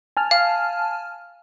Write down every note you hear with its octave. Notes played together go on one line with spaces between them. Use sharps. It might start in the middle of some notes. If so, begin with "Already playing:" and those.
G#5 A5 F6
F5